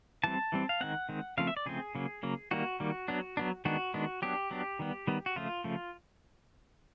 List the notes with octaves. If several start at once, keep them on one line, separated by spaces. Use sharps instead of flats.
E3 G3 C4 A5
E3 G3 C4
F5
D#3 G#3 C4 F#5
D#3 G#3 C4
C#3 F3 A3 C4 F5
E5
D5
C#3 F3 A3 C4 G#4
C#3 F#3 A#3
C#3 F#3 A#3
D#3 G3 A#3 F#4
D#3 G3 A#3
F#3 B3 D4
F#3 B3 D4
D#3 G#3 B3 D4 F#4
D#3 G#3 B3 D4
F#3 B3 D4 G4
F#3 B3 D4
D#3 G3 B3
D#3 G3 B3
F#4
C#3 F3 A3 F4
C#3 F3 A3